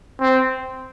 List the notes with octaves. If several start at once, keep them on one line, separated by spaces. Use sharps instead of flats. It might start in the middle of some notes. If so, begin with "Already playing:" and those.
C4